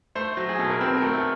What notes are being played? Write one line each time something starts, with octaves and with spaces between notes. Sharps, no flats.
A3 C5
F#3
G#4
B2 A4
A#4
C4 B4
A#4
A3
A4